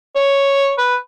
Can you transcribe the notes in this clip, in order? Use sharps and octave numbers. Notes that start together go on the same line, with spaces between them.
C#5
B4